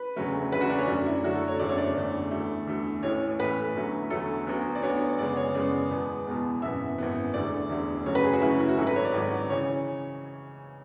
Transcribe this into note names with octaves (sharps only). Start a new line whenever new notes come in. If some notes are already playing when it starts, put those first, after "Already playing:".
Already playing: B4
E1 D2 C#3 F#3 A3
E1 D2 C#3 F#3 A3 B4
F#4
D4
C#4
F#2 D3 F#3 A3 D4
E4
F#2 D3 F#3 A3 F#4
A4
C#5
F#1 E2 D3 A3 D5
C#5
D5
F#1 E2 D3 A3
E2 D3 A3
E2 D3 A3
A1 A2 E3 A3 C#5
A1 A2 E3 A3 B4
E2 D3 F#3 A3
E2 D3 F#3 A3 A4
D2 D3 F#3 B3
D5
D2 D3 F#3 B3 C#5
F#2 C#3 G#3 B3 D5
C#5
F#2 C#3 G#3 B3 D5
E2 B2 G#3 B3
E2 B2 G#3 B3
G#1 F#2 E3 B3 E5
G#1 F#2 E3 B3
E1 E2 D3 A3 D5
E1 E2 D3 A3
F#2 C#3 F#3 A3 C#5
B4
G#4
F#4
F#2 C#3 F#3 A3 E4
C#4
E4
F#4
G#1 G#2 F#3 A4
B4
C#5
D5
G#1 G#2 F#3
C#3 E3 C#5